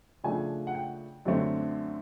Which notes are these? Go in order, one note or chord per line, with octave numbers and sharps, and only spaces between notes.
C#3 F3 A3 D4 G#5
F#5
G5
F#2 D3 F#3 A3 C4